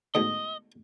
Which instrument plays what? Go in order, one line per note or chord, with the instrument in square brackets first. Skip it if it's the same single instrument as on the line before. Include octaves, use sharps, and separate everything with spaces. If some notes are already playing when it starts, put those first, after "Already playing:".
[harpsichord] D2 G#2 B2 [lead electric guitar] D#5